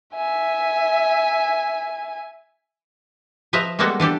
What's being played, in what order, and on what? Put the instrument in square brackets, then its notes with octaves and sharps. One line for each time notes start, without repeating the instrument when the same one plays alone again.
[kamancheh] E5 G#5
[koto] F3 B4 D#5 E5 A#5
G3 G#3 A#3 B3 F#4 A4
E3 D4 G4 A4